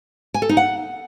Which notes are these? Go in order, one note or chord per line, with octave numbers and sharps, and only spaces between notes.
G#5
A4
D#4
F#5